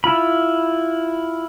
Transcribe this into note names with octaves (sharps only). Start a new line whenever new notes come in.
E4 F4 B5